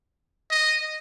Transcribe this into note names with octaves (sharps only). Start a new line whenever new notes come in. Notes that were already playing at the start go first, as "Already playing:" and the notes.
D#5